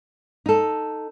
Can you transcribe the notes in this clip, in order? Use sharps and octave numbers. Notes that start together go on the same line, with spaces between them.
D#4 A4